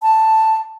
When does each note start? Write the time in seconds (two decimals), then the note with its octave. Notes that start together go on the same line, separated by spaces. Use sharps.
0.02 A5